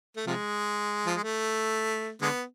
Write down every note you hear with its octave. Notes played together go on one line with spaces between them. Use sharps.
A3
C3 F3 G#3
F3
G#3
A3
D3 G#3 B3